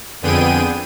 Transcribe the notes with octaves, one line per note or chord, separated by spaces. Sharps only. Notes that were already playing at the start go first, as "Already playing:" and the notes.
F2 D3 B3 G#4 G5 D#7